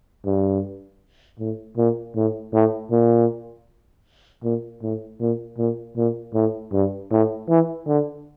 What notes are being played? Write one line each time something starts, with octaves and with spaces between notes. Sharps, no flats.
G2
A2
A#2
A2
A2
A#2
A#2
A2
A#2
A#2
A#2
A2
G2
A2
E3
D3